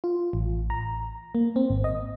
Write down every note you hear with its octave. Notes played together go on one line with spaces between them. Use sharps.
F4
A1
A#5
A#3
C4
G#1
D#5